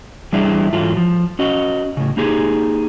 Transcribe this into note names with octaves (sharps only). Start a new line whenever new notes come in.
E2 G3 D4 E4 G#4 E5
G#2 E3 F#3 F4 A4
F3
C#4 F#4 D#5
A2 C#3
A#3 D#4 G4 G#4